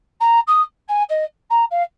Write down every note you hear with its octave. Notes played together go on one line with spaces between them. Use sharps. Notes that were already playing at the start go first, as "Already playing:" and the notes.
A#5
D#6
G#5
D#5
A#5
F5